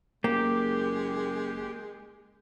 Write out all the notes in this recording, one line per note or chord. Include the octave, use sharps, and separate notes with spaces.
F#1 G#3 A#3 G4